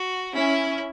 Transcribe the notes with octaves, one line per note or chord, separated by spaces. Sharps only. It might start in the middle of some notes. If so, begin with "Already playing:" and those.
Already playing: F#4
C#4 E4